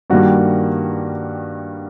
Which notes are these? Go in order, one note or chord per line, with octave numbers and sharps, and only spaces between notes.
G2 D#3 G3 A#3 F#4